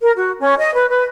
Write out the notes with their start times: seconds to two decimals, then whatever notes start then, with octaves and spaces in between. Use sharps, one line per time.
0.01 A#4
0.16 F#4
0.40 C#4
0.58 D#5
0.74 B4
0.88 B4